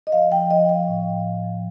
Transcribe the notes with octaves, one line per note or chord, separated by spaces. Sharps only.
D#5
F3 F5
F3 G5
F3 D#5
F3 F5
A2
A2
F3
F3